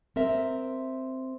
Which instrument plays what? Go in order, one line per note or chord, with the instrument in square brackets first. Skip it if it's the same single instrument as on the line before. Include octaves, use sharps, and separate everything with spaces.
[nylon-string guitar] C4 A#4 E5